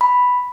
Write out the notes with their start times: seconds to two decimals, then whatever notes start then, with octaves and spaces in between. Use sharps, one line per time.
0.01 B5